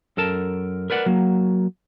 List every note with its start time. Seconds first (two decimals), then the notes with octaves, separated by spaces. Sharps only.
0.17 F#2 A4 A#4 A5
0.90 A#4 B4 D5 F#5
1.06 F#3 A#3